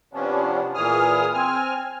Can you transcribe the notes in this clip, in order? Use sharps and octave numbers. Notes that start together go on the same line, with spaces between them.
C3 F3 B3 C#4 D4
A#2 E3 G#4 D#6 F6
C4 G#5 F6